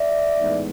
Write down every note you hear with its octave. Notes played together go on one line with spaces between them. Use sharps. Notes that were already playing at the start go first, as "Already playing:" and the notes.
Already playing: D5 E5
A2 E3 G#3 B3 D#4